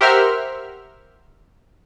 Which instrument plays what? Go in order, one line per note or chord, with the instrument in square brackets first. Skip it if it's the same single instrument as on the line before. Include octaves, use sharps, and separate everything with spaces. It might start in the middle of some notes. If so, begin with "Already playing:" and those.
[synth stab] G4 A#4 C5 E5 F#5 F6